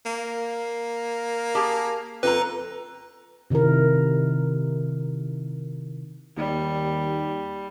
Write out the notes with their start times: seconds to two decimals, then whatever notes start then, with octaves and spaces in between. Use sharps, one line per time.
0.06 A#3
1.55 G4 G#4 A5
2.23 F2 C4 A4 B4 A#5
3.50 C3 D#3 D#4 E4 A#4
6.37 D#2 G3